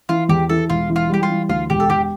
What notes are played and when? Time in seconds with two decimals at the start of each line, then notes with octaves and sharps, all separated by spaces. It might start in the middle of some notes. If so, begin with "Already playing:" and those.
0.09 E3 F4
0.29 E2 G4
0.49 E3 A4
0.69 E1 F4
0.89 E3
0.96 F4
1.09 G3 G4
1.23 F4
1.29 E3
1.49 D2 F4
1.70 E1 G4
1.80 A4
1.89 E1 G4